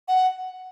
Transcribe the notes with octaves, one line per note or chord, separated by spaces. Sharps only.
F#5